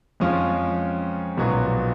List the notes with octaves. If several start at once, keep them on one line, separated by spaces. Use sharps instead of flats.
F2 F3 G#3 C#4 F4
B1 A#2 F#3 B3 F#4